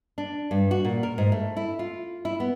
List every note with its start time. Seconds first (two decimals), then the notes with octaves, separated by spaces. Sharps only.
0.18 D4
0.51 G2
0.71 F#4
0.84 A#2
1.03 A#4
1.18 G#2
1.32 A3
1.57 E4
1.79 F4
2.25 E4
2.40 B3